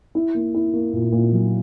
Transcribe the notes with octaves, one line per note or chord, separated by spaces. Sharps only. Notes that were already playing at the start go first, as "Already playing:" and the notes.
E4
A#3
E4
A#3
A#2
A#2
F#3